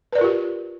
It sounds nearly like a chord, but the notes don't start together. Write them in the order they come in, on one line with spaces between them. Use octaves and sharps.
B4 D5 A#4 F4 G4